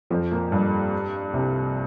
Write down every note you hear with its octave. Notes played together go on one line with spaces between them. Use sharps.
F2 F3
A#2 A#3
G2 G3
C2 C3